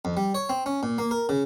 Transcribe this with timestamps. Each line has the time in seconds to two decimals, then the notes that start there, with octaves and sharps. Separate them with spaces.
0.05 F2
0.17 G3
0.35 C#5
0.49 C4
0.66 C#4
0.83 A#2
0.98 A#3
1.11 A#4
1.29 C#3